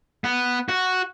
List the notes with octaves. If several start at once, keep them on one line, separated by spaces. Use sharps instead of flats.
B3
F#4